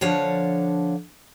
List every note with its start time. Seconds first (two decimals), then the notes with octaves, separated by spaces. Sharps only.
0.01 D3 F3 D4 C#5 F5 F#5